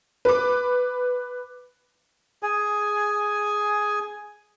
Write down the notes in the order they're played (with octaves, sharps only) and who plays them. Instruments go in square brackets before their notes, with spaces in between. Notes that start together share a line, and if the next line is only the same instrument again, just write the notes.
[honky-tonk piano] B4 D6
[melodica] G#4 G#5